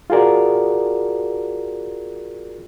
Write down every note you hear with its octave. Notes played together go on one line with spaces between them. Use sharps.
F4 F#4 G#4 A#4 D5